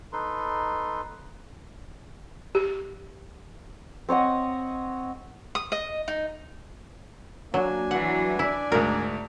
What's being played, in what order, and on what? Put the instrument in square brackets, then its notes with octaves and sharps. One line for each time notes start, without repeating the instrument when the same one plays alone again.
[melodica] D#4 A4 B4 C6
[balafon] G4
[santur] C4 C#5 D#5 F#5
[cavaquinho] D#6
D#5
D#4
[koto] F#3 [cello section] A#3 [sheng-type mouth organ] D4 G#5
[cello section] E3 F#3 [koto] F#5
[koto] E4 [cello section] D5
[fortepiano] D2 G#2 [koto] A#4